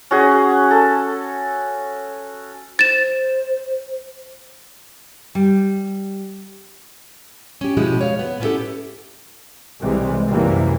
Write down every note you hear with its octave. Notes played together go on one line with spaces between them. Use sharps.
C#4 F#4 G#4
A4
C5 A6 E7
G3
C#4 G4
B2 F3 G#3 E4 F#4 G4
C#5 F5
B3
B3 C#4 D4 E4 G4 A4
C2 C3 E3 G3 G#3
F#2 C3 E3 G3 A#3